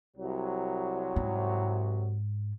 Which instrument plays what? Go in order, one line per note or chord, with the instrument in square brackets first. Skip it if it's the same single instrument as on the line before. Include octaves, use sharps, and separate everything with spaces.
[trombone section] C2 F#3
[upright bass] G#2